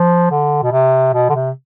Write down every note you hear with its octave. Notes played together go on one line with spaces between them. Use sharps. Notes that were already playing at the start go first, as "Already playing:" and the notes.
Already playing: F3
D3
B2
C3
B2
D3
C3